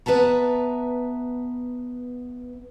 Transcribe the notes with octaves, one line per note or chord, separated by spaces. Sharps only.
B3 B4 E5 A5 A#5